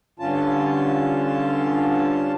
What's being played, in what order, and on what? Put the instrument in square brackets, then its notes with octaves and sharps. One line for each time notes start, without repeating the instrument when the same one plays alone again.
[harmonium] G2 D3 C#4 F4 A5